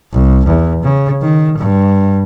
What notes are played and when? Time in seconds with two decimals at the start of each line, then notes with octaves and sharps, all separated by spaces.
0.13 C2
0.46 E2
0.83 C#3
1.22 D#3
1.58 G2